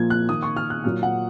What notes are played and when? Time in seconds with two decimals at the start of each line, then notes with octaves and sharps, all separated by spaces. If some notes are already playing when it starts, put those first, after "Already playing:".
Already playing: A#2 F3 A#3 G#6
0.10 F#6
0.29 D#3 A#3 D#6
0.43 C#6
0.56 F6
0.70 F#6
0.84 A#2 F#3 A#3 F6
1.03 F#5